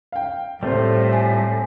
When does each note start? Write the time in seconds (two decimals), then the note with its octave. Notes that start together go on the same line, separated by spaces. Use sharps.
0.12 F5 G5
0.63 A2 G3 A3 C4 F4 C5
1.13 G#5